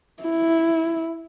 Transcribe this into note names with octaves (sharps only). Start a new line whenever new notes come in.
E4